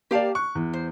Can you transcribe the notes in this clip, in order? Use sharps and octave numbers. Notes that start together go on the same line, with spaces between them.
A#3 G4 D5 F5 A5
C#6 F#6
E2
C5